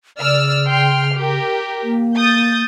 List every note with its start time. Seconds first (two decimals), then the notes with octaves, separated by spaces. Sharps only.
0.19 C#3 D5 E6 F6
0.68 G5 C6 F6
1.15 G4 A#4
1.83 A#3
2.16 D#6 G6 A6